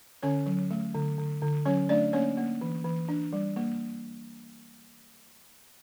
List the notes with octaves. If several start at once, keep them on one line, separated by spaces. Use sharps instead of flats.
D3 C#4 C#5
F#3
A3
D3
D3
D3
F#3 C#4 C#5
A3 D4 D5
A#3 C#4 C#5
A#3
E3
E3
D4
G3
A#3